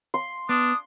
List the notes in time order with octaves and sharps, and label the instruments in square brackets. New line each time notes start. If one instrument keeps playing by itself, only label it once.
[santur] C6
[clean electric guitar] B3 [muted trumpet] D4 [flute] D#6